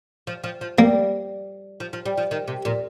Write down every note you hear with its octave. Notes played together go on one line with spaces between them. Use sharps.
F3
F3
F3
G3 A#3
F3
F3
G3
F3
D#3
C3
A#2